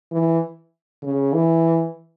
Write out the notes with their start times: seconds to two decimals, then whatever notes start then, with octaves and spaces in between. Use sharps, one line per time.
0.11 E3
1.03 C#3
1.33 E3